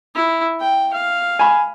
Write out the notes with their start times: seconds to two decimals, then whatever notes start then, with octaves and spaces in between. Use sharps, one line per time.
0.15 E4
0.60 G5
0.94 F5
1.39 G#5 B5